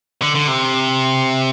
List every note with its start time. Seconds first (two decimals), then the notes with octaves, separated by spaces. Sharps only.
0.22 D3
0.35 D3
0.48 C3